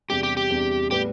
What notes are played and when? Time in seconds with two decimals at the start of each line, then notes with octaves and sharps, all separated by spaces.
0.10 E2 C3 G3 D4 G4
0.23 G4
0.37 G4
0.50 E2 C3 G3 D4
0.91 A2 G3 B3 G4